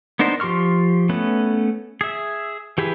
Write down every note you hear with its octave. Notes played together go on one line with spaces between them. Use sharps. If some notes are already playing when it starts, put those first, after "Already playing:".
B3 D4 D#4 A#4 C5
F3 G4 C6 C#6 F6
A3 B3 C#4 B4
G#4 E5
E3 G4 G#4 B4